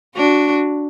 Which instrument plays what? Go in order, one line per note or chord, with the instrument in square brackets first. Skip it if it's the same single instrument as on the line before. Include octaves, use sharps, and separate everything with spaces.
[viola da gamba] D4 F#4